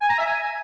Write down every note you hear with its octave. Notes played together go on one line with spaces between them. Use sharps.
G#5
A#5
E5
G#5